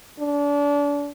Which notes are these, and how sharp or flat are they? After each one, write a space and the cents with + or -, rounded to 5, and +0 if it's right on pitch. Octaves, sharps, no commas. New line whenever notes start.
D4 -30